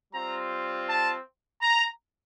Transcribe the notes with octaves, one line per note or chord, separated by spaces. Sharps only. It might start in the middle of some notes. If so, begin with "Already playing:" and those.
G3 C4 F4 A#5
A5
A#5